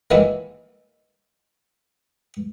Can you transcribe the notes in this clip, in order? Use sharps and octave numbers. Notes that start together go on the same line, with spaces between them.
D#3 E3 F#3 G#3 A#3 E4